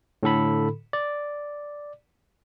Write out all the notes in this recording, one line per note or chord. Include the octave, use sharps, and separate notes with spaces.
A2 D3 A4 B5
D5